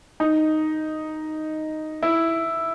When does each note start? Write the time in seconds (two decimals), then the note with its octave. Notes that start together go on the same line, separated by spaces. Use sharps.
0.20 D#4
2.03 E4